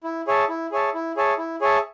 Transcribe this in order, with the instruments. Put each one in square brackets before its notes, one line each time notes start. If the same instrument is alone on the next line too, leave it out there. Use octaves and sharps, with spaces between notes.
[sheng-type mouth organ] E4
G#4 C#5 E5 A5
E4
G#4 C#5 E5 A5
E4
G#4 C#5 E5 A5
E4
G#4 C#5 E5 A5